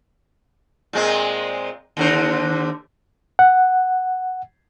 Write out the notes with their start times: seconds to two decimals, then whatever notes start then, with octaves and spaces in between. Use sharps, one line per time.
0.93 A#2 G#3 C4
1.97 D#2 D3 C5
3.39 F#5